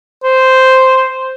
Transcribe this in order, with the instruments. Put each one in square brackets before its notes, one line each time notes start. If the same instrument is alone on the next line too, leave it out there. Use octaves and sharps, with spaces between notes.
[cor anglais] C5